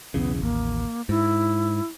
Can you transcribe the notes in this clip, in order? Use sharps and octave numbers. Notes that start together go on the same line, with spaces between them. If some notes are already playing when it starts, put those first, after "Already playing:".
B1 E2 C#3 B3
A1 D#2 A#3
G#2 E4